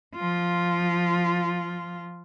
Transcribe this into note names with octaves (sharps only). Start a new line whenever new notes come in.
F3 F4